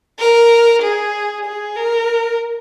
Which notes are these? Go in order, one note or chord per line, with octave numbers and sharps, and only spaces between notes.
A#4
G#4
G#4
A#4